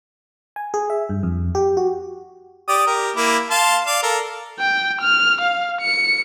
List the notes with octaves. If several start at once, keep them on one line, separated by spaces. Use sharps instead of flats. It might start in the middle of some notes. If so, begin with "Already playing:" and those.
G#5
G#4
E5
G2
F2
G4
F#4
G4 D5 D#6
G4 A#4
A#3 E4 D6
F5 A5 C6
D5 F5
A4 A#4
G5
F6
F5
C#7